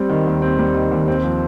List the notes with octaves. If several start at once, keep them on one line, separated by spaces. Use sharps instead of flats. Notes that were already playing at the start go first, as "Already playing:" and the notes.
Already playing: G3 C4
D#3
D#2
C4
G3
D#3
D#2
C4
F3